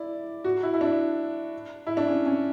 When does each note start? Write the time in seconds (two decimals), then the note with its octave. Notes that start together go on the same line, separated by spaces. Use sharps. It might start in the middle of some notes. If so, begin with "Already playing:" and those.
Already playing: E4 D5
0.44 F#4
0.63 E4
0.74 E4
0.81 D4
1.87 E4
1.97 D4
2.08 C#4
2.26 C#4